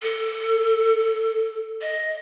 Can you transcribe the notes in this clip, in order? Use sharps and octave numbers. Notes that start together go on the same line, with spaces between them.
A4
D#5